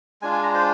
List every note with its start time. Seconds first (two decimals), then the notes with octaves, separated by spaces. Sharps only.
0.22 G#3 D4 F4 G#5
0.33 G#5
0.43 A#5
0.54 C5